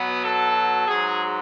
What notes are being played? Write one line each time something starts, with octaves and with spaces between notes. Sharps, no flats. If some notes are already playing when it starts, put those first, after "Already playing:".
Already playing: B2 F#3 B3
A4
G#2 F#3 G#4